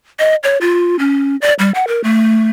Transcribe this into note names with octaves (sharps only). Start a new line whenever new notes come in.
D#5
C#5
F4
C#4
D5
G3
F#5
A#4
A3